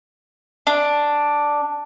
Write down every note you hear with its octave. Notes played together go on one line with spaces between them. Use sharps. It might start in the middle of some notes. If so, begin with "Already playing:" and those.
D4